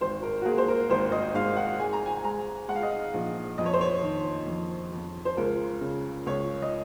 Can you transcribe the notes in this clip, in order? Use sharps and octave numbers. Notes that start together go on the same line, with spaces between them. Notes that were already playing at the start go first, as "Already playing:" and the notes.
G#1 C5
A#4
F#4
A#3 G#4
C5
A#4
G#1 C5
D#5
G#2 F5
F#5
G#3 G#5
A#5
G#5
G#5
G#3 A#5
G#3 F#5
F5
D#5
F5
A#1
F2 D#5
C#5
C5
C#5
D#3
F2
F2
C5
C#2 A#4
C#3
C#2 C#5
D#5